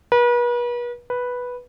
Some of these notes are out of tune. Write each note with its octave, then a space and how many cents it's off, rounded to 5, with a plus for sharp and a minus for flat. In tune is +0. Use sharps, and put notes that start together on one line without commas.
B4 -40
B4 -5